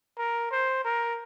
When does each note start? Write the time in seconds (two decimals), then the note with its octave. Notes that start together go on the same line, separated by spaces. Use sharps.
0.18 A#4
0.52 C5
0.85 A#4